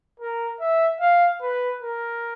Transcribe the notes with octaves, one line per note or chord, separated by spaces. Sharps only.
A#4
E5
F5
B4
A#4